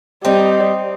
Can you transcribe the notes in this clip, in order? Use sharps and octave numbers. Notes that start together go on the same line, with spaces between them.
G3 C4 D#4